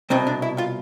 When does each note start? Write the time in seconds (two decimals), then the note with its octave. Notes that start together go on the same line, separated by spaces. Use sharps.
0.10 C2 B2 C4
0.27 D4
0.42 E4
0.58 F4